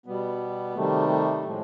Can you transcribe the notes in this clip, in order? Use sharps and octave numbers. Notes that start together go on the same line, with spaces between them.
B2 G3 B3
C3 D#3 G3 A3
A3
A2 F3 G#3